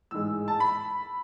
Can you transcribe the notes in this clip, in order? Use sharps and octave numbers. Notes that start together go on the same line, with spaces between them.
A1 G#2 G#3 E6
A5
B5